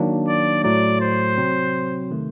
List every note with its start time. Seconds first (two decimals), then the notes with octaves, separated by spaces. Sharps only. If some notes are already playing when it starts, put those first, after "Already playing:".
Already playing: D#3 F#3 A#3 D4
0.28 D5
0.63 A2 F#3 A3 D5
1.01 C5
1.37 C3 F#3 C4
2.11 C3 D#3 A3